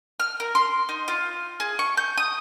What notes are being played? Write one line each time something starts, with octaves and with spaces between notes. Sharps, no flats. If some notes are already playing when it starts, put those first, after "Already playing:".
F6
A#4
C6
D#4
F4
G#4
C#6
G6
D#6